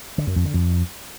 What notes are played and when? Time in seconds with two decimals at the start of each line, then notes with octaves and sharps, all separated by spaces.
0.18 D3
0.27 F#2
0.36 F2
0.45 D3
0.54 F2